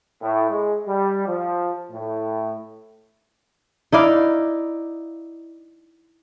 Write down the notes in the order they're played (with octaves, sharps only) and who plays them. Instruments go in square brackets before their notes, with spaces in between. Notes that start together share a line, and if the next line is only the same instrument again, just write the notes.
[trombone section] A2
G#3
G3
F3
A2
[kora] D#4 E4 D5 F5